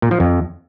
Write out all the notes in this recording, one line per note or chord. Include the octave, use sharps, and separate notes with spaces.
A#2
F3
F2